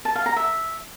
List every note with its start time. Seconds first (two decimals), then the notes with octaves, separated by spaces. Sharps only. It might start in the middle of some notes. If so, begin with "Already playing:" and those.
0.05 A5
0.15 F5
0.26 A#5
0.36 E5